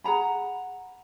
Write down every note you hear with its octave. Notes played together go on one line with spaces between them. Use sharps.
G#4 F#5 A#5 B5